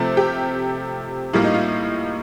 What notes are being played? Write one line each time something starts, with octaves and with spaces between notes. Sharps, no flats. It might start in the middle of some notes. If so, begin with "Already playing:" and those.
Already playing: C3 F3 A3
G4
A2 G3 A#3 F4
D#4
F4